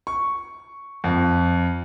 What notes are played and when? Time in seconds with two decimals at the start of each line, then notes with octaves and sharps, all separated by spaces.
0.07 C#6
1.04 F2